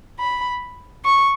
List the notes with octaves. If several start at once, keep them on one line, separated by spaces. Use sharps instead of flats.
B5
C#6